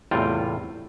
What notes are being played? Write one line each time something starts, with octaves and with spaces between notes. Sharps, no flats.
E2 A2 C3 G3 F4 G5